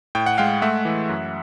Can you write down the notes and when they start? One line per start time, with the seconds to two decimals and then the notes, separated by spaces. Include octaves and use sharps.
0.15 A2 G5
0.26 F#5
0.38 G#3 F5 G5
0.62 A3 E5 F#5
0.85 E3
1.09 F#2